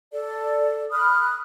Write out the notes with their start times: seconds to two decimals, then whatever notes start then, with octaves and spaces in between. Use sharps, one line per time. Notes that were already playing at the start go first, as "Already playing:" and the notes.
0.13 A4 D5
0.92 B5 D#6 F6 F#6